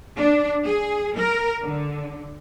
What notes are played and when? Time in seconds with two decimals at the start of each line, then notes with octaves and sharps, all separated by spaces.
0.17 D4
0.65 G#4
1.17 A#4
1.62 D3